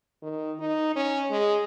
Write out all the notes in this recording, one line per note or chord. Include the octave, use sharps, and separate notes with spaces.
D#3
D#4
C#4
G#3